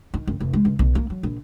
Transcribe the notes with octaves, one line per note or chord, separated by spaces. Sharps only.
D#3
F#1
F1
G#3
C#2
B1
A#3
F#3
A#1